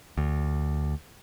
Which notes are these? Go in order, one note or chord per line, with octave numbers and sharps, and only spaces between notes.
D2